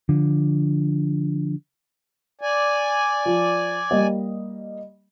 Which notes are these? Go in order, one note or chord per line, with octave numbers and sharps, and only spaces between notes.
D3 F3
D5 G#5
F3
G3 A#3 D#5